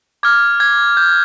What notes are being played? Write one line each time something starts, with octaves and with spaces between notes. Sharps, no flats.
D6 F6 G#6
G#6
G6